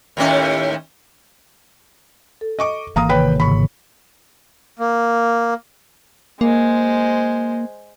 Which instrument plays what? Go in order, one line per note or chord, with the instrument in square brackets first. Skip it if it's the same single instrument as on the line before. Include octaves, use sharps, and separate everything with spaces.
[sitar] D#2 A2 C#4
[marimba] A4
[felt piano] D#5 C#6 D6
[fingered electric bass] G#1 E3 A#3 [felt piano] F5 A#5 D#6
[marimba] C3 D#3 C#5 [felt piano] B4 G5 B5
[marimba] G#2 C#3 [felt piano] B5 C#6
[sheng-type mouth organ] A#3
[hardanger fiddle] G#3 C5 [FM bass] A#3